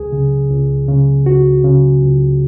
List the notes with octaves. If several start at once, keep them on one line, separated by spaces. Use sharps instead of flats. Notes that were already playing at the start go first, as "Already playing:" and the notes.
Already playing: C#2 G#4
C#3
C#2
C#3
C#2 F#4
C#3
C#2